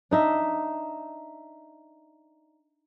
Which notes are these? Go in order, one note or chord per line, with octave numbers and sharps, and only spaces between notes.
D4 D#4 E5